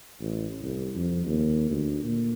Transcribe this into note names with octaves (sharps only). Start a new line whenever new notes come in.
A1
C2
F2
D#2
D2
A#2